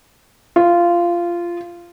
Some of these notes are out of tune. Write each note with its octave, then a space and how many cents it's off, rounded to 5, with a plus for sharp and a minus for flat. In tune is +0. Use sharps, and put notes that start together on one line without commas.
F4 -15